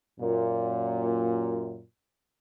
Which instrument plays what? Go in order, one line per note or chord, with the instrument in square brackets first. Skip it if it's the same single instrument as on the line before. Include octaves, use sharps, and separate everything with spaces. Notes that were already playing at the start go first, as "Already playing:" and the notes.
[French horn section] F#2 A#2